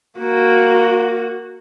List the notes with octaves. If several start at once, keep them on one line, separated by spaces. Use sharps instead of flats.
A#3 F#4